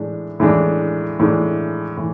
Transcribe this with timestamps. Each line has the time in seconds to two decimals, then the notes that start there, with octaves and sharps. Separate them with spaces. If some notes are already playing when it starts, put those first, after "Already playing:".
Already playing: A2 E3 G#3 D4
0.40 A2 E3 G#3 D4
1.20 A2 E3 G#3 D4
1.97 A2 E3